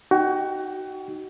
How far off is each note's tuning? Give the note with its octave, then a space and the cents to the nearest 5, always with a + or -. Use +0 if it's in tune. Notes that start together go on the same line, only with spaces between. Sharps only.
D#4 +0 F#4 +25 G5 +0